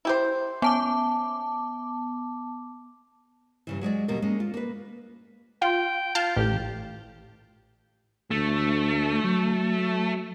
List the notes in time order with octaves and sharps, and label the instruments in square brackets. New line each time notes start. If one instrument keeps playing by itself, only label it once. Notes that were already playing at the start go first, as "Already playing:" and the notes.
[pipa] E4 G4 C5
[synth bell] B3 A5 D6 [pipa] C#4
[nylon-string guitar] G2 C#3 E3
F#3 G#3 C#5 D5
D#2 B2 G3 A3 A#4
G#3 A#3 C#4
F4
A#3 B4
[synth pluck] F4 [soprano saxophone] G5
[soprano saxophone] F4 [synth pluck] A5 F6 G6
[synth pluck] A1 [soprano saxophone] G4
[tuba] D2 [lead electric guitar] A3
[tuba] F#3